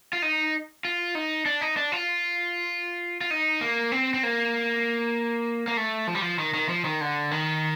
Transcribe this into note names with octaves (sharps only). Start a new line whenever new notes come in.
F4
D#4
F4
D#4
D4
D#4
D4
F4
F4
D#4
A#3
C4
C4
A#3
A#3
A3
F3
G3
F3
D#3
D#3
F3
D#3
D3
D#3